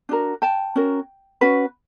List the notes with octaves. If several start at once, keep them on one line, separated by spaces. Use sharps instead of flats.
D4 F#4 A#4
G5 A5
C#4 F#4 A#4
C#4 F#4 B4